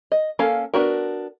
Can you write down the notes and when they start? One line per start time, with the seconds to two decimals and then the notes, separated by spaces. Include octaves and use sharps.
0.12 D#5
0.39 A#3 C#4 A4 F5
0.74 B3 D4 F#4 A#4